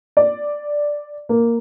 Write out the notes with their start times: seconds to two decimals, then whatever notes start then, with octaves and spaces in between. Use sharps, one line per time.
0.17 D5
1.29 A#3